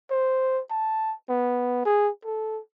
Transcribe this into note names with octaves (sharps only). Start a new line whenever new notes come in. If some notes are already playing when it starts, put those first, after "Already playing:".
C5
A5
B3
G#4
A4